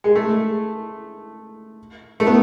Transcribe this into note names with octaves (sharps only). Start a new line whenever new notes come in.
G#3
A3
A3
B3